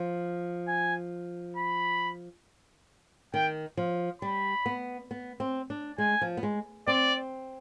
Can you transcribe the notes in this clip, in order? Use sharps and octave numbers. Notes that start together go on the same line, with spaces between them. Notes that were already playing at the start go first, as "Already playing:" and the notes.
Already playing: F3
G#5
B5
D#3 G5
F3
G3 B5
B3
B3
C4
D4
G#3 G#5
F3
B3
G#3
C4 D5